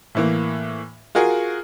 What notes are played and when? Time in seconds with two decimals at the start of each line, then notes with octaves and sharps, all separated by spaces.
0.15 A2 E3 A#3
1.15 F4 F#4 G#4 A#4